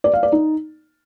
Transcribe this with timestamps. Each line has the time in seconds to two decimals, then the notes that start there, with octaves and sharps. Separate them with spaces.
0.04 D5
0.14 F5
0.23 D5
0.32 D#4